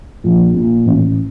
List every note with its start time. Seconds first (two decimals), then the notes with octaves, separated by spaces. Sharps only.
0.24 A#1
0.54 A#2
0.85 A1